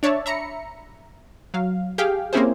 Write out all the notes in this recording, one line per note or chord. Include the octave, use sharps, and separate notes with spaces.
D4 C#5 D5 E5 A5
E5 A#5 B5 C#7
F#3 F5
G4 G#4 F5 G5
A#3 C4 C#4 E4 G#4 C5